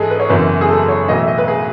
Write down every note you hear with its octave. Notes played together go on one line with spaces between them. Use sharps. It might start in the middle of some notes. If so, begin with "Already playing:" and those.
Already playing: G#2 E3 G#3 G#4 A4
B4
C#5
F#1 F#2 E3 B3 B4
G#4
A4
C#5
B1 A2 E3 D#5
E5
D#5
B4
G#4